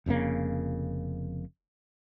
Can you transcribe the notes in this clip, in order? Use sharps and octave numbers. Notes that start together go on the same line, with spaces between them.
F1 F2 C#3 A#3